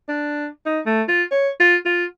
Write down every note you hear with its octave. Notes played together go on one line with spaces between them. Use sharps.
D4
D#4
A3
F4
C#5
F4
F4